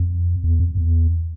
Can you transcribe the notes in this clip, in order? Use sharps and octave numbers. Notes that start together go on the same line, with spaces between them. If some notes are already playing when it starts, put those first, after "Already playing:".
Already playing: F2
E2
F2
E2